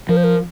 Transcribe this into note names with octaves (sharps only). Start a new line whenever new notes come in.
F3 A#4
C5
A#4